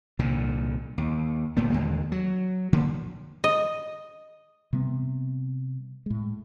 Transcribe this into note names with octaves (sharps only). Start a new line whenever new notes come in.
C2 A#2 D3
D#2
G1 A#2 A3 B3
D#2 D3 G#3
F#3
D3 F3 A#3
D#5
C3 G3 B3 C4
A2 G#3